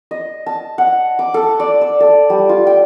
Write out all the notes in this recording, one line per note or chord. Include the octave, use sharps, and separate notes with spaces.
D#5
A5
F#5
D6
A4
D5
E6
A4
G3
F4
G5